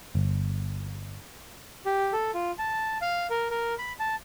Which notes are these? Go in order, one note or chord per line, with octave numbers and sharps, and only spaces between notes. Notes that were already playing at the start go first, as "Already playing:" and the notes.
G1
G4
A4
F4
A5
F5
A#4
A#4
B5
A5